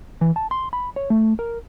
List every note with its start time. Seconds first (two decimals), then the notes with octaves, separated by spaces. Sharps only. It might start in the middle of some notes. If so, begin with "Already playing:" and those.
0.21 E3
0.36 A5
0.51 C6
0.73 B5
0.96 C#5
1.10 A3
1.39 A#4